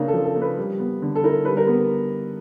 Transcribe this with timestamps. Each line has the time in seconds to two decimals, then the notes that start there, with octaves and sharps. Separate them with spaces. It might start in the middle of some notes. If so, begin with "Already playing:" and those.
Already playing: C#3 A#3 D4 A#4
0.08 A4
0.14 F3
0.25 A4
0.36 A#3
0.41 B4
0.57 G3
0.80 B3
1.02 D3
1.16 A4
1.23 E4 A#4
1.45 G3 B4
1.57 A#4
1.68 B3